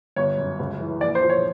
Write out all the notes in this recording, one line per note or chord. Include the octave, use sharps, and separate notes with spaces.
G1 C#5
F#2
C#2
E3
A#1 D5
C5
F3
C#5